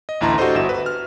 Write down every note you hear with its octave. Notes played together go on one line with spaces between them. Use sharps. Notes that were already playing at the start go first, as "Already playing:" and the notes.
D#5
A1 D2 E4 A5 A#5 C6
D4 F#4 G4 A4 C5 D#5
G1 F#4 E5 E7
B4
F6